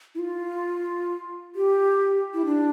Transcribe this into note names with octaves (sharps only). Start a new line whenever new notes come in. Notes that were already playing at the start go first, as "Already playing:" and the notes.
E4
F4
G4
E4
D4